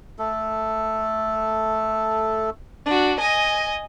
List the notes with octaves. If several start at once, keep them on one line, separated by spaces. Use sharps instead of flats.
A3 A4
D4 F#4
D#5 G#5